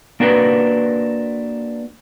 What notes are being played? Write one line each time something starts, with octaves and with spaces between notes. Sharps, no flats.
A#3 D4 F#4 A#4 B4